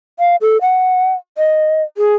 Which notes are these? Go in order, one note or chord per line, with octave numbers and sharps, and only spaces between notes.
F5
A4
F#5
D#5
G#4